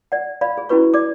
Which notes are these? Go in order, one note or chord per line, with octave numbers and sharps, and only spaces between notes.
D5 F#5
D5 F5 B5
G#4
C#4 E4 F#4 B4 C#6
D5 D6